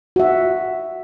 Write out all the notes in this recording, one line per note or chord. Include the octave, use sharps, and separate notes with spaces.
F#4 E5